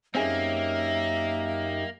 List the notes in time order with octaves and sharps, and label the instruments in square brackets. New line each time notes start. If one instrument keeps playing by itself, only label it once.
[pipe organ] F#2 D#4 G4 [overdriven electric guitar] A#3 [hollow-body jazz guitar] C4 C#4 G#4 [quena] E5